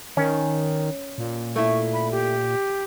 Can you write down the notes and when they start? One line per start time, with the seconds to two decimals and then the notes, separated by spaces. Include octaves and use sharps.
0.17 D#3 C#4
1.18 A#2
1.56 A3 E4 C#6
1.94 B5
2.12 G4